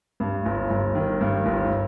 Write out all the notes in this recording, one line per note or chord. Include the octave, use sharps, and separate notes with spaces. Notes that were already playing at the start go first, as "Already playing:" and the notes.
G2
G1
G1
D#3
G2
G1